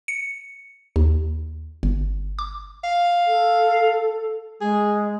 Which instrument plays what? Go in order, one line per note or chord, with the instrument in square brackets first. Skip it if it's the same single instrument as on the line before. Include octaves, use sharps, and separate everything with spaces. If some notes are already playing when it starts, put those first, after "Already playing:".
[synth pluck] C#7
D#2
G1
D6
[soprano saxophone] F5
[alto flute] A4
[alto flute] G#3 [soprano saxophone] G#4